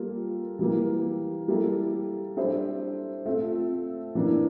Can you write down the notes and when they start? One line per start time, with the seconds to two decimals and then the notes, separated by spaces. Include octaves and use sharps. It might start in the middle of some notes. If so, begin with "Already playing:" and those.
Already playing: G3 A#3 F4 A4
0.59 E3 G3 A#3
1.48 G3 A#3 E4 A4
2.37 G3 D4 A4 C5 E5
3.26 A3 C4 F4 A4 E5
4.15 A2 E3 A#3 D4